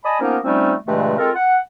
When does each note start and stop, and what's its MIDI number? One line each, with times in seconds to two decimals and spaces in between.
0.04 0.18 74
0.04 0.18 75
0.04 0.18 80
0.04 0.18 81
0.04 0.18 83
0.04 0.18 87
0.20 0.37 53
0.20 0.37 58
0.20 0.37 59
0.20 0.37 61
0.20 0.37 63
0.20 0.37 70
0.44 0.73 53
0.44 0.73 55
0.44 0.73 57
0.44 0.73 60
0.44 0.73 61
0.44 0.73 63
0.86 1.14 43
0.86 1.14 46
0.86 1.14 49
0.86 1.14 52
0.86 1.14 56
0.86 1.14 57
1.18 1.30 56
1.18 1.30 60
1.18 1.30 65
1.18 1.30 69
1.18 1.30 70
1.35 1.58 78